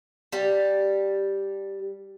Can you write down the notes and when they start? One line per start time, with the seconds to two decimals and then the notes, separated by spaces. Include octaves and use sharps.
0.32 G3 G4 A5